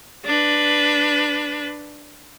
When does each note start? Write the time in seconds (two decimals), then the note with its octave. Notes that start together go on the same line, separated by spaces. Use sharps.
0.25 D4 B4